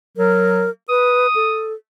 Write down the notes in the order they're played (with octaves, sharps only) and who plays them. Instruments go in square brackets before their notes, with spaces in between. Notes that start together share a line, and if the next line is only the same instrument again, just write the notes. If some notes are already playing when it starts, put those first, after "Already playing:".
[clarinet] F#3 [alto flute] A#4
[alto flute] B4 [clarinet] D#6
[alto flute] A4